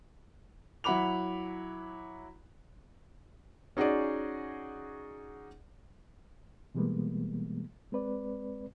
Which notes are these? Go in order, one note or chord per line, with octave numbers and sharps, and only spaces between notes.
F#3 E4 F#5 B5 D6 F7
C#4 D#4 F#4 G#4 D5
B2 E3 G3 G#3 A#3 B3
G#3 C4 B4 D5